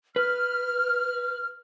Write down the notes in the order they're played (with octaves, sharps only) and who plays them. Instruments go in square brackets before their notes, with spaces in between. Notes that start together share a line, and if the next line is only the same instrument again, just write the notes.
[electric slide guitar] B4 [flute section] F6